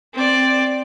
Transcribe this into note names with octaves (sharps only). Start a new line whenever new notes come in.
C4 D5